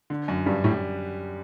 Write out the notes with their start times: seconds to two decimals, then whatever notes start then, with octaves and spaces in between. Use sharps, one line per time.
0.10 D3
0.28 F#2
0.46 G2 G3
0.64 A2 G3